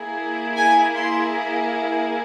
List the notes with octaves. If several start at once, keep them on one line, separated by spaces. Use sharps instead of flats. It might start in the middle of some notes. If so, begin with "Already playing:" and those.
Already playing: A#3 E4 G#4
G#5
C6